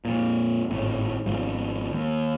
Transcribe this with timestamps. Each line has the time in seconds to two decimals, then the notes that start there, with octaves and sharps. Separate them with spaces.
0.05 F2 A#2
0.69 G#1 A2
1.26 G#1 G#2 F3
1.92 D#2